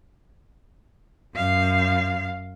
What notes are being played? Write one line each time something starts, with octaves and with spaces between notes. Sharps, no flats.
F#2 F5